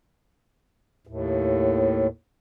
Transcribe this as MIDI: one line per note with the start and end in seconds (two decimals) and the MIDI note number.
1.07 2.07 39
1.07 2.07 45